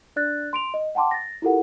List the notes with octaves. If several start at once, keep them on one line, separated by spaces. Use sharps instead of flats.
D4 D5 F#6 A6
C6 D7 F7
D#5
F#5 G5 A5 C6 D6
A6 A#6
E4 F4 G4 A4 A#4 F#5